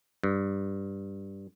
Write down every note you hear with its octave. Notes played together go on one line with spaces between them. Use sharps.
G2